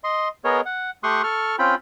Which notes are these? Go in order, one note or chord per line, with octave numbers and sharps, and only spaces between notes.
D#5 C6
B3 G#4 A#4 C#5 D#5
F#5
A3 G4 C6 C#6 D#6 F#6
A4 C#6 F6
C4 C#4 F4 G5 B5